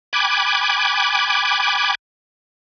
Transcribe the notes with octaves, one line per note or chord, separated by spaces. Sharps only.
G5 G#5 B5 D6 F#6 G#6